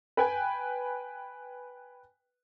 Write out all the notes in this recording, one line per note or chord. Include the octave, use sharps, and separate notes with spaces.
B4 G5 G#5